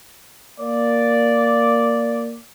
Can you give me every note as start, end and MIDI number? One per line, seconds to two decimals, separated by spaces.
0.61 2.38 58
0.61 2.38 74